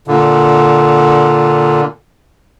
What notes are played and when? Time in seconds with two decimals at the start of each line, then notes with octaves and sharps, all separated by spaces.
0.08 A#2 D3